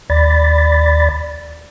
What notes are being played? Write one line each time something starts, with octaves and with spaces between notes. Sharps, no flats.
D#2 D5 B5 A6